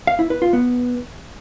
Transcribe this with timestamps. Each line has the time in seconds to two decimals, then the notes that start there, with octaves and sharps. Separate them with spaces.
0.07 F5
0.19 E4
0.30 B4
0.42 F4
0.53 B3